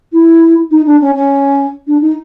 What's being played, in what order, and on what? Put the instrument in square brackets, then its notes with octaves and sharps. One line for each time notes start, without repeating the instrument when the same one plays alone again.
[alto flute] E4
D#4
D4
C#4
C#4
D4
D#4